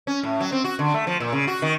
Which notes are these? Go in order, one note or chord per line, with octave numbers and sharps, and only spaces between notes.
C#4
A2
F#3
C4
F#4
D3
A3
F3
A#2
C#3
F#4
D#3